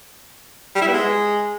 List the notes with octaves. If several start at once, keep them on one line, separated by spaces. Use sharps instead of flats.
G3
E4
B3
G#3